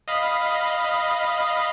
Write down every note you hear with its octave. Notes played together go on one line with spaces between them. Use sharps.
D#5 F5 B5